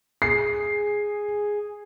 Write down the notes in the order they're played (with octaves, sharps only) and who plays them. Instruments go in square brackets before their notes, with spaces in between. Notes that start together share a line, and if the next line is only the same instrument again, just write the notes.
[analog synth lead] G#4 [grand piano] C7